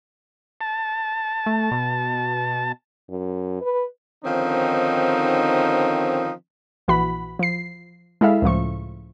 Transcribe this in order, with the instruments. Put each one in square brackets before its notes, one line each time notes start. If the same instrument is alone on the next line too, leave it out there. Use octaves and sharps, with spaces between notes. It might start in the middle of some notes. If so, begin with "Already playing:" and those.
[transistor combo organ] A5
[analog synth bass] A3
B2
[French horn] F#2
B4
[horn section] D3 D#3 F3 C4 C#4 D#4
[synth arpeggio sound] A#1 E3 F#4 B5
F3 C7
G#3 E4 A4 E5 F5
C#2 A2 F3 C#6